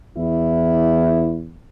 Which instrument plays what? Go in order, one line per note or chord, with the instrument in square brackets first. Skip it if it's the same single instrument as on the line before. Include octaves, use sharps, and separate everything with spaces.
[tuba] E2 [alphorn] E4